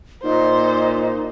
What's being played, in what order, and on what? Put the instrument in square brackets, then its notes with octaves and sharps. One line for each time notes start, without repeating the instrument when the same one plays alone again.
[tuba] A#2 [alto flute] D#4 [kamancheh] C5